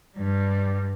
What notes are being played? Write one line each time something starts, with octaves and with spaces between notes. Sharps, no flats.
G2 G3